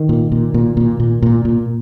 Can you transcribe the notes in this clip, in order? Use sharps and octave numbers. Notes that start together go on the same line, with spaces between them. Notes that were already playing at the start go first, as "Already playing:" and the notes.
Already playing: D#3
A#2
A#2
A#2
A#2
A#2
A#2
A#2